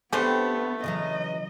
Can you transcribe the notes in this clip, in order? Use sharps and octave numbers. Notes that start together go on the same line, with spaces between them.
D3 A3 B3 C4 G4 B4 C5
C#3 E3 F#3 D#5